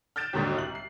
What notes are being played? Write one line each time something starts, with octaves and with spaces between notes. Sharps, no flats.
F6 G6 A6 D7 E7
D#2 G#2 B2 D3 F#3 G3
C2 F#7
C7